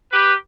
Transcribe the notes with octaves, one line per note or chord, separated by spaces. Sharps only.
G4 B4